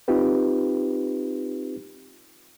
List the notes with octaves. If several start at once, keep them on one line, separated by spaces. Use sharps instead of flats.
C4 D#4 F4 G4 B4